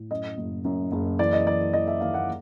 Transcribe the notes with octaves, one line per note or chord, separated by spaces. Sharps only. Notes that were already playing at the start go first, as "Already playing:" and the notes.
Already playing: A2
F#2 D#5
F#1
F#2
F#1
E3 D5
D#5
E3 D5
E3 D#5
E5
D#2 F5
F#5